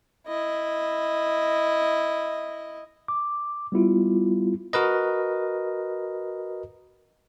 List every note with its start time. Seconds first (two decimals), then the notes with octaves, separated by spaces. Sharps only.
0.28 E4 D#5
3.08 D6
3.72 G3 B3 E4 F4
4.73 F#4 A#4 B4 D#5